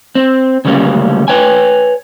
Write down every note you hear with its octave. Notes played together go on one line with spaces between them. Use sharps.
C4
D2 C#3 F#3 G3 A#3 C#4
B4 C#5 G5 G#5